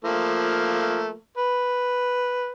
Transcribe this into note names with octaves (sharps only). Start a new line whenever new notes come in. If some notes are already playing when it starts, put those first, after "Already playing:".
F3 A3 A#3
B4